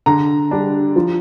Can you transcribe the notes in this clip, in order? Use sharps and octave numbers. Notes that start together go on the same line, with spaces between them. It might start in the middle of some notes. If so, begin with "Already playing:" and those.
D3 A#5
G3 D4
F3